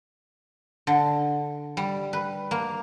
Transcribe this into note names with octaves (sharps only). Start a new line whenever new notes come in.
D3
G3
B4
A#3